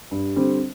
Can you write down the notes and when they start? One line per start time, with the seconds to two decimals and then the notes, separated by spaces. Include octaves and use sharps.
0.11 G2
0.36 D3 G3 C4